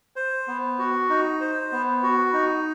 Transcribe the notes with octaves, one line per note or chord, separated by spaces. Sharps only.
C5
B3
F#4
D#4
C5
B3
F#4
D#4